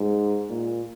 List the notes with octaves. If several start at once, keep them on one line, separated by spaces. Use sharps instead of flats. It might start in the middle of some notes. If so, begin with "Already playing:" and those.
Already playing: G#2
A#2